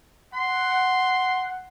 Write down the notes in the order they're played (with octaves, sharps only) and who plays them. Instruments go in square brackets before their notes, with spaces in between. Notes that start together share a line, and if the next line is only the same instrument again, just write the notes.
[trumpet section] F#5 [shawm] C6